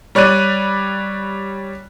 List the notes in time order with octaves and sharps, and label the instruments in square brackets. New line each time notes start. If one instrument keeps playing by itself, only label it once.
[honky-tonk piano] G3 C#5 D5 F#6 D#7